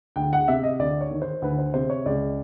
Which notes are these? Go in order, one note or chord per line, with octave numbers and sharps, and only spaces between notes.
D2 G5
F#5
C3 E5
D#5
D2 D5
C#5
D#3
C5
D2 B4
C5
C3 C5
C#5
C#2 D5